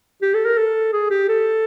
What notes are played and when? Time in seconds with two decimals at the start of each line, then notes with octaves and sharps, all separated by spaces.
0.22 G4
0.34 A4
0.45 A#4
0.57 A4
0.92 G#4
1.10 G4
1.28 A4